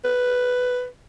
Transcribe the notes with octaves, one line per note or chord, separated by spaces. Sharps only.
B4